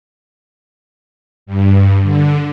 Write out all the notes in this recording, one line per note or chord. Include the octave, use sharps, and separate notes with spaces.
G2
D3